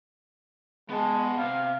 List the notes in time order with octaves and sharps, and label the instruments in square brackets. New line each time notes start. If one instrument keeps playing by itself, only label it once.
[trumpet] G#3 [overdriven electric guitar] B3 A5
[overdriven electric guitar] C3 [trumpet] F5